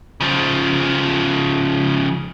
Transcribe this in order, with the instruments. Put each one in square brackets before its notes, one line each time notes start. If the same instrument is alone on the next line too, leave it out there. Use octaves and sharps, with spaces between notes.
[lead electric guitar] C#3 F3